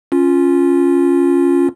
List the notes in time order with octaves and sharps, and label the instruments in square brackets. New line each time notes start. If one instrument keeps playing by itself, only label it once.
[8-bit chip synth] C#4 F4